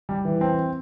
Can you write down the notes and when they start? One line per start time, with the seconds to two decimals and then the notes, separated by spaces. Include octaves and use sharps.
0.09 G3
0.25 E3
0.41 C4